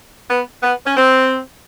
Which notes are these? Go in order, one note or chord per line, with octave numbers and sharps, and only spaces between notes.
B3
B3
C#4
C4